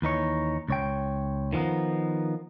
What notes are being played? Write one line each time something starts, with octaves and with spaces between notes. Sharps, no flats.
D#2 E3 D#4 C#5
C#2 C#5 G5
D#3 F3 G3 B3 D#4